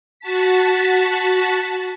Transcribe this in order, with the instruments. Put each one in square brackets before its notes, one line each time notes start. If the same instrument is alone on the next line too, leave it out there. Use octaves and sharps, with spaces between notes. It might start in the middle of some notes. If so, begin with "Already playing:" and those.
[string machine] F#4 A5 B6